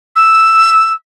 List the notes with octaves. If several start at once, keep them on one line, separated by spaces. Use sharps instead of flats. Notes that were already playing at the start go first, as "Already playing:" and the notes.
E6